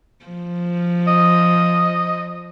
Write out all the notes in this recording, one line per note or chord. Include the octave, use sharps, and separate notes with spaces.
F3
D#5